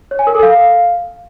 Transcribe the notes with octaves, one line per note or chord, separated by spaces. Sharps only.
C#5
G#5
A#4
A4
F5